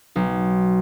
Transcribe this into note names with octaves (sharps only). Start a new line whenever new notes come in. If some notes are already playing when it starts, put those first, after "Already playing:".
B1